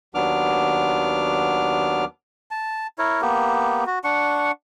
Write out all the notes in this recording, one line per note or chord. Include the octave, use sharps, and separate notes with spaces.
D#2 F#3 B3 D4 D6 F6
A5
E4 A#4 C#5
A#3 B3 G4
F#4
D4 F#5 C#6